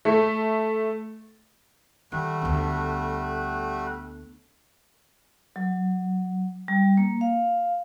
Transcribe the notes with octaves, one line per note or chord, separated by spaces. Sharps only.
A3
D#3 G3 A3 F#4
D2 B3
F#3
G3
A#3
F5